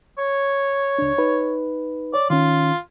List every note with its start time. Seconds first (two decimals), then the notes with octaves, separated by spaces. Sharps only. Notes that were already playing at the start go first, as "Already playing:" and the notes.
0.18 C#5
0.99 C#2 D4
1.18 D#4 B4
2.14 C#5 D5
2.30 D#3 C#4 F4